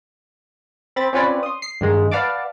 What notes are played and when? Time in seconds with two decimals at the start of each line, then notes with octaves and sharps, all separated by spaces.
0.96 C4 B5 A6
1.13 C4 C#4 F4 B4 C#5 D5
1.43 C6 D#6
1.62 C7
1.81 G2 D#3 G#3
2.11 B4 D5 F5 F#5 A5 D6